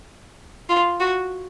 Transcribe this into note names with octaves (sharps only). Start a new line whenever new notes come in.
F4
F#4